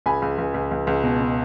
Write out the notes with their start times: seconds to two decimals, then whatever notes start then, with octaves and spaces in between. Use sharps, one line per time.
0.06 C#2 G#5 B5
0.22 C#2
0.38 C#2
0.54 C#2
0.71 C#2
0.87 C#2
1.03 B2
1.21 B2